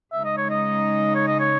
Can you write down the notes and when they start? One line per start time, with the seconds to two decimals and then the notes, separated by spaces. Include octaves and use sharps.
0.12 C#3 G#3 D#4 E5
0.25 D#5
0.37 C#5
0.50 D#5
1.15 C#5
1.27 D#5
1.40 C#5